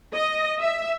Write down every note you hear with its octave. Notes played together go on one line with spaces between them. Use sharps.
D#5
E5